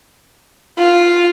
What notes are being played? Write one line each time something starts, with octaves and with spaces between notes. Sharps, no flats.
F4